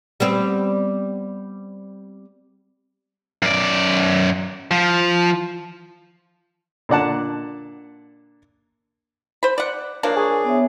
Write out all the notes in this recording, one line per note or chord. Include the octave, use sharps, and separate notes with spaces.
G3 B3 C4
F#2 D5
F3
A#2 D3 D5 F#5 A5
C5 B5
D5 F#5
F3 F#3 A#3 D4
G#4 A#4 C#6
B3 C#5 E5